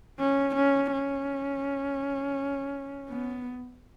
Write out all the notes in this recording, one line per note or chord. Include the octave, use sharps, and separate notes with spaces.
C#4
C#4
C#4
B3